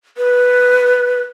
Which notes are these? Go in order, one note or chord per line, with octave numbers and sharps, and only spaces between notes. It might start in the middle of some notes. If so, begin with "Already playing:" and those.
B4